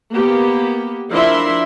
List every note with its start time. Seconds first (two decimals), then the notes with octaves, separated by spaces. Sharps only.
0.12 A#3 B3 G4
1.11 F3 D4 E4 A#4 E5 C6